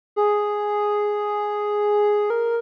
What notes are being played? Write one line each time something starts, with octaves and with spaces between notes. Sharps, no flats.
G#4
A#4